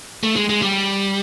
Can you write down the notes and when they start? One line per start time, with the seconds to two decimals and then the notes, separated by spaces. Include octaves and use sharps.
0.23 A3
0.36 G#3
0.49 G#3
0.62 G3